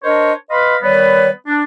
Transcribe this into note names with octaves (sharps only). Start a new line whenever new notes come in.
D4 A#4 C5 C#5 D#5
B4 D#5 F5 B5 C6
D#3 G3 B3 B4 C#5
D4